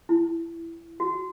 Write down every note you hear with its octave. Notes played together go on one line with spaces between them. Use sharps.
E4
F#4